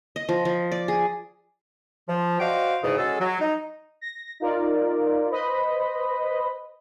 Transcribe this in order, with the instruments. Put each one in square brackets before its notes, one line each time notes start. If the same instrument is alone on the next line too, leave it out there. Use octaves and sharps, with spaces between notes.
[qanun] D#5
F3
F3
D5
G#4
[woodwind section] F3
F#4 C5 D5 D#5 F5 G5
E2 G#2 C#3
G#3 C#4 F#4 G#4 A4
F#3
D#4
[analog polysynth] A#6
D#4 F4 A#4 D5
B4 C5 D#5 B5